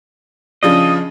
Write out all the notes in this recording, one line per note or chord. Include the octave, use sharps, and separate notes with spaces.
C#3 F3 D4 D#5